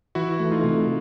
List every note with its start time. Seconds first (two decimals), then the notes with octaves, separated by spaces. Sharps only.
0.15 E3 E4 F#4
0.39 A3
0.51 D#4 F4
0.64 C3